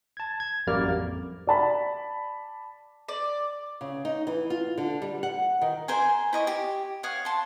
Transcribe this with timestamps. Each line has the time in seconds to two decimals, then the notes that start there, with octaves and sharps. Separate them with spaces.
0.17 A5 G#6
0.40 G#6
0.67 A1 F#2 G3 A#3 D5 F6
0.83 F2
1.47 D5 A5 B5
3.08 D5
3.81 C#3
4.05 D#4
4.27 E3
4.50 F4
4.78 D3
5.02 G3
5.23 F#5
5.61 D#3
5.88 G#4 A#4 C5 G#5
6.33 E4 D#5 C#6
6.47 G4
7.03 C#5 F5 F#5 D#6
7.25 A5 C6